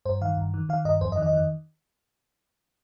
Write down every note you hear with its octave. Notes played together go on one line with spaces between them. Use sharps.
G2 C5
D#3 F5
G2
D#3
D#3 F5
G2 D#5
F2 C5
D#5
D#3
D#5
D#3